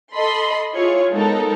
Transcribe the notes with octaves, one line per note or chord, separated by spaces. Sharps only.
A4 D#5 B5 C6
E4 F4 G#4 C#5
G#3 B3 D#4 A4 A#4